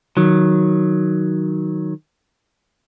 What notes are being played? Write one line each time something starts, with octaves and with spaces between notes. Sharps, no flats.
D#3 F#3